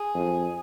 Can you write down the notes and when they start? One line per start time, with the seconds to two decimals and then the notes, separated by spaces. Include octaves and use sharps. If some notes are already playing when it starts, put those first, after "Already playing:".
Already playing: G#4
0.14 F2